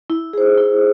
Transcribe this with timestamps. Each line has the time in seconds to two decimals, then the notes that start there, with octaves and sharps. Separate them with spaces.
0.10 E4
0.33 G#4 C5
0.58 E4